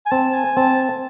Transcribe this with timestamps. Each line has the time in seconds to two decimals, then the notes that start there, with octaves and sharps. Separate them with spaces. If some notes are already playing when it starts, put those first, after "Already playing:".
0.06 G#5
0.11 C4 A5
0.34 G#5
0.57 C4 A5